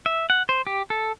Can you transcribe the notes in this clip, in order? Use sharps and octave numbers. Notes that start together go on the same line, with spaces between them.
E5
F#5
C5
G4
A4